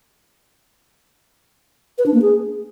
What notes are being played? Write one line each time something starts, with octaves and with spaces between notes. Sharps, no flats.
B4
D4
A#3
G#4